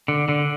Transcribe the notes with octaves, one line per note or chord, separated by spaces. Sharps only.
D3
D3